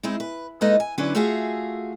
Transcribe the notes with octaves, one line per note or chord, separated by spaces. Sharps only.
G#3 C4 D#4 E4
B4
G#3 A#3 D#4 A4 B4 D#5
G#5
D3 F#3 C#4 D4 E4 B4
A3 F4 F#4 G#4 E5 F5